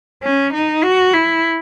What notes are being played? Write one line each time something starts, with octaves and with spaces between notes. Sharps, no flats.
C#4
D#4
F#4
E4